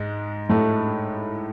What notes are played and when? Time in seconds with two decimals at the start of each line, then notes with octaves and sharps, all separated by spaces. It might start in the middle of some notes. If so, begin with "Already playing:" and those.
Already playing: G#2 G#3
0.49 A2 A3